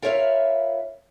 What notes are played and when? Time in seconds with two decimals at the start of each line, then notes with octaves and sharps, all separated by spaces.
0.02 F4 A#4 B4 C#5 E5 F5